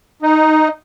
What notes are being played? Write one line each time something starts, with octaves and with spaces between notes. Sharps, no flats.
D#4